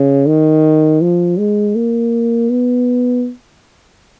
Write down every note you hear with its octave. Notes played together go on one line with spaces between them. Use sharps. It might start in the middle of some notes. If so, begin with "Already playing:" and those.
Already playing: C#3
D#3
F3
G#3
A#3
B3